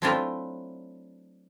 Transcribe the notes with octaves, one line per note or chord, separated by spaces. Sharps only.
F#3 A3 C4 D4 E4 F4